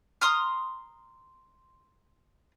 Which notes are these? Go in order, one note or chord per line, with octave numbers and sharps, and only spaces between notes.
A#5 C6 D#6 F6